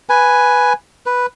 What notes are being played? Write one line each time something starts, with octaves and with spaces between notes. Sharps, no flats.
B4 G#5
B4